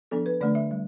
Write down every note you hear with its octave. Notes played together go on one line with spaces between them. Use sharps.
F3 B3 D4 A4
B4
D3 A3 D4 D5
E5
G3